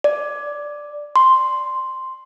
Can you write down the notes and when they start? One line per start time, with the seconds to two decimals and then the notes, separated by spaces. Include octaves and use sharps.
0.04 D5
1.16 C6